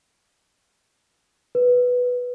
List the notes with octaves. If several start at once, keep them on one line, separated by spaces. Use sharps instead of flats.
B4